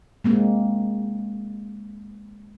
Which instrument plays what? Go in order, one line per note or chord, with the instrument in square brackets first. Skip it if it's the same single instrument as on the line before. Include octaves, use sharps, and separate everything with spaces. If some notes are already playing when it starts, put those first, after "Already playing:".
[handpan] G#3 A#3 C4